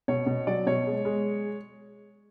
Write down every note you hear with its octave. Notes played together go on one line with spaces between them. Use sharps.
B2 C#5
B2
F#3 D5
B2 C#5
G#3
G#3